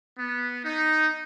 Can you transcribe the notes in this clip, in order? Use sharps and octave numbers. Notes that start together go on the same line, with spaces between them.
B3
D#4